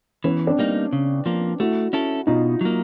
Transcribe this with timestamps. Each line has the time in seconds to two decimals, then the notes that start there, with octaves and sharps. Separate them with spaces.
0.24 E3 B3 C#4
0.47 C4 D4
0.59 G3 A#3 D#4
0.93 C#3
1.26 F3 A#3
1.60 A3 E4 F#4
1.93 C#4 E4 A4
2.27 B2 D#4 F4
2.61 F#3 A#3